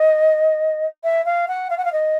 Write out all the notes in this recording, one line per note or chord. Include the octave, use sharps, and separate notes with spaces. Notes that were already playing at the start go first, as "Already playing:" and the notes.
Already playing: D#5
E5
F5
F#5
F5
F#5
F5
D#5